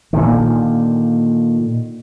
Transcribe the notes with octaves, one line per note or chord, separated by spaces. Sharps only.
A#2 D3 D#3